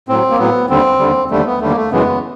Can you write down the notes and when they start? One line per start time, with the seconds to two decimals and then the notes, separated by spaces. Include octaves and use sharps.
0.09 A2 F#3 C4
0.30 A#3
0.38 A2 F#3 B3
0.69 D#2 D3 G3 C4
0.99 D#2 D3 G3
1.30 D#2 D3 G3 A3
1.46 B3
1.61 D#2 D3 G3 A3
1.69 A#3
1.76 A3
1.92 F#2 C#3 E3 G#3 B3